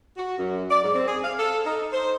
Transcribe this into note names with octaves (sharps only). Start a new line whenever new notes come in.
F#4
F#2
D5
G#2
C4
G#4
F5
A4
D#4
C5